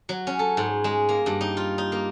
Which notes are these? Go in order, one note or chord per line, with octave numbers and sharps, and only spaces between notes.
F#3
C#4
A4
G#2
G#3
A#3
G2
D#4
F4
D#4
A#3